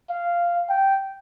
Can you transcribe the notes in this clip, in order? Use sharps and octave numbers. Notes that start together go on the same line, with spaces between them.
F5
G5